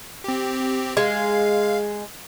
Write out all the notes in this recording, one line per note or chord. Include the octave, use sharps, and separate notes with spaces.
C4 G4
G#3 F5